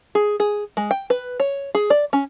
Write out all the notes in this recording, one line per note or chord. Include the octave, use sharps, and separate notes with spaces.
G#4
G#4
G#3
G5
B4
C#5
G#4
D5
C#4